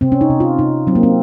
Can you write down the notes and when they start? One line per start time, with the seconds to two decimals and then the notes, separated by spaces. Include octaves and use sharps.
0.01 C3 C4
0.12 C#4
0.21 D#4
0.30 C3
0.40 F4
0.59 C3 D#4
0.87 F#3 C4
0.95 A#3
1.03 C4